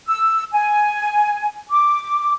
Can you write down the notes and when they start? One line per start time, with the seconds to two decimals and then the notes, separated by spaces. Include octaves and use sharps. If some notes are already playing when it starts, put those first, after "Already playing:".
0.08 E6
0.52 G#5
1.70 D6